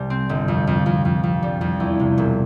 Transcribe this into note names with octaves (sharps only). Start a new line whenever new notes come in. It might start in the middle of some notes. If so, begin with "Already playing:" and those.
Already playing: C2 G3
C4
G1
F2
F2
F2
F2
F2
G3
F2
E2
C3
E1